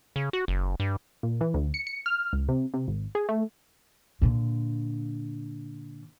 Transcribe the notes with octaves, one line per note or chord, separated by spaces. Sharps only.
C#3
F#4
F#1
G2
A#2
E3
D2
C#7
C#7
F6
C#2
C3
C3
G#1
G#4
A3
A#2 D3